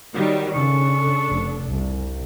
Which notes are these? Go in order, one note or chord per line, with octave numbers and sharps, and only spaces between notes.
D#3 F#3 G3
C#3 D4 A4 C#6
F1
C2